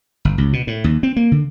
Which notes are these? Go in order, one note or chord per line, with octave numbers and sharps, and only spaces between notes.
G1
C#2
B2
A2
D#2
C4
A#3
D3